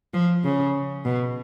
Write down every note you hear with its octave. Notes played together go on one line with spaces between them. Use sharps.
F3
C#3
B2